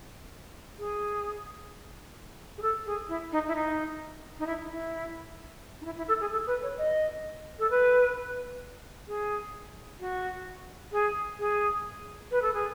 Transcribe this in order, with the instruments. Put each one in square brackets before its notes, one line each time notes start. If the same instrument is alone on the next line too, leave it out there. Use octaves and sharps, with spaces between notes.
[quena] G#4
G#4
A4
G#4
E4
D#4
E4
D#4
D#4
E4
E4
D#4
E4
E4
A4
G#4
A4
B4
C#5
D#5
A4
B4
G#4
F#4
G#4
G#4
B4
A4
G#4